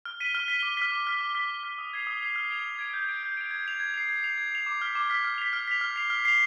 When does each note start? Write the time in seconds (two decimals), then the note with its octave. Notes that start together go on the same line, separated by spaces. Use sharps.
0.05 F6
0.20 B6 D#7 G7
0.35 F6
0.48 B6 D#7 G7
0.63 D6
0.77 F6 B6
0.92 D6
1.07 F6 B6
1.21 D6
1.35 F6 B6
1.50 D6
1.63 F6 B6
1.78 D#6
1.93 G#6 C7 F7
2.07 D#6
2.22 G#6 C7 F7
2.36 F6
2.51 G#6 D7 F7
2.64 F6
2.79 G#6 D7 F7
2.94 G6
3.09 D7 F7
3.23 G6
3.37 D7 F7
3.51 G#6
3.66 C7 F7
3.80 G#6
3.94 C7 F7
4.09 G#6
4.23 C7 F7
4.38 G#6
4.52 C7 F7
4.66 D6
4.82 F6 B6
4.95 D6
5.10 F6 B6
5.24 F6
5.38 B6 F7
5.53 F6
5.68 B6 F7
5.81 F6
5.96 C7 F7
6.10 F6
6.25 C7 F7